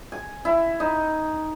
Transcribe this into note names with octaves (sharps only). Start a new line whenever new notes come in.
G#5
E4
D#4